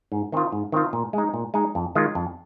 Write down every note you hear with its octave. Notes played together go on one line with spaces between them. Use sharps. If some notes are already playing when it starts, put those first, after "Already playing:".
G#2
D#3 C4 F4
G#2
D#3 C4 F4
A#2
G#3 D#4
A#2
G#3 D#4
F2
D#3 G#3 F4
F2